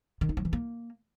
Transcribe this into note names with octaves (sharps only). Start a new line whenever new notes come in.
D#3
D#4
F3
E3
A#3